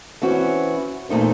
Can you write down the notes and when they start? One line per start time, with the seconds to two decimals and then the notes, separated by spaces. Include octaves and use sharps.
0.22 E3 C4 C#4 F#4
1.09 E2 A#2 A3 D#4 C5